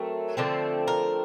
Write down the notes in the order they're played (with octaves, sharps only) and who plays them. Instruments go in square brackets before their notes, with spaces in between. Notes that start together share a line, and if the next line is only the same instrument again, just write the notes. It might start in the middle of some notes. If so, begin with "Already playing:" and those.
Already playing: [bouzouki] F#3 A3 C4 A#4
D3 F3 A3 C4
A#4